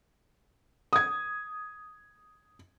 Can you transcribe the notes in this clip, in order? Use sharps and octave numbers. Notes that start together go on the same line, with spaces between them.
D#6 G#6